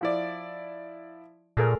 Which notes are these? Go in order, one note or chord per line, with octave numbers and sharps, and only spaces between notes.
F3 E4 D5
A#2 A3 G#4 A#4